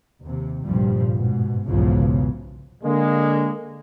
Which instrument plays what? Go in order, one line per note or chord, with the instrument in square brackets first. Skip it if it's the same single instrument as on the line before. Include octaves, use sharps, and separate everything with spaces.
[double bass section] D#2 C3
F1 D2 G2 A#2 F3 G3
G#2 B2
B1 E2 G#2 C#3 E3 F3
[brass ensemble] D3 G#3 A#3